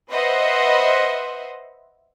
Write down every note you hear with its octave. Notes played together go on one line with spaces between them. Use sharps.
B4 C5 D#5 E5 F#5 C6